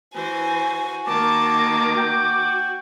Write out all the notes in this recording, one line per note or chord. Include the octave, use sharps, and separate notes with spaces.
E3 F#4 C5 G#5
D#3 A#3 A5 D6
F#4 G5